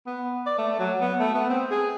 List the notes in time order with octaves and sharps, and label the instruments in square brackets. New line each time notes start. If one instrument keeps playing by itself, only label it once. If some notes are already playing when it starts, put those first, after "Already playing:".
[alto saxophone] B3
D5
A3
F#3
B3
A3
B3
C4
G#4